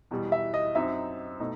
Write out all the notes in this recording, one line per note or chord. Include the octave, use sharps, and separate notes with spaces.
E2 B2 G3
E5
D#5
F#2 F#3 C4 D#4 E5
B2 A3 D#4